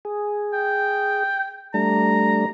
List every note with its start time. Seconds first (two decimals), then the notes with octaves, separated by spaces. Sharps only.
0.05 G#4
0.53 G5
1.74 G3 A3 D4 A#5